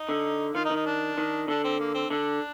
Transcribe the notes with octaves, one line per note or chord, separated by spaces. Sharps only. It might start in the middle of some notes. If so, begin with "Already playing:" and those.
Already playing: D#4
D3
D#3 F4
D#4
D#3
D#4
D4
D#3
D3 D4
C4
A#3
C4
D3 D4